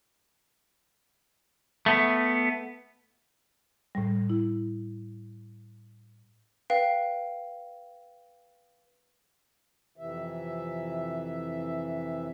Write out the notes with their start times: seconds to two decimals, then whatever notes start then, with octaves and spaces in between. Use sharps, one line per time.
1.86 A3 B3
3.95 A2 G3
4.30 E4
6.70 B4 F5 G5
9.97 F2 C3 E3 E5